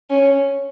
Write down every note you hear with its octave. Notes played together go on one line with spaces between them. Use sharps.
C#4